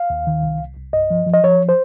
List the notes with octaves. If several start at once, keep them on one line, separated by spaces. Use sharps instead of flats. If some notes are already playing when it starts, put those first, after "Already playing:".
Already playing: F5
D#2
D#3
C2
C2
C2
G2 D#5
F3
F3
D#5
F3 C#5
C5